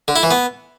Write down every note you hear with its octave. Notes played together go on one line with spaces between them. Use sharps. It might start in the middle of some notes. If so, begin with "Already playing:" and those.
D3
E4
E3
B3